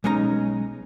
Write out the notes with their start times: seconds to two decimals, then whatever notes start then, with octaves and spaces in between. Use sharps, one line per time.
0.04 B1 G#3 C#4 D#4 A#5